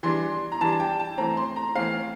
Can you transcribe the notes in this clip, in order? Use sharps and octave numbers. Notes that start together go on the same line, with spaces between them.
E3 G3 D4 C6
A#5
E3 G3 D4 A5
A5
G5
A5
E3 A3 C4 A#5
C6
A#5
E3 A3 C4 F5